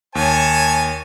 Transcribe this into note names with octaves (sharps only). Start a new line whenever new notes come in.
D#2 C#5 G#5 A5